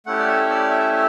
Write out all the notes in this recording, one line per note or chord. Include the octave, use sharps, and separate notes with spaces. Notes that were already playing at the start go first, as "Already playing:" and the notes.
A3 C#4 E4 G4 F#5
D5
E5
D5
E5
E5